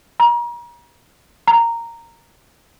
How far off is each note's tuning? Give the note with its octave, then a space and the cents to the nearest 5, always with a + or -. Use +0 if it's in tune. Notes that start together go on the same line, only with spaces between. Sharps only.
A#5 +35
A#5 -10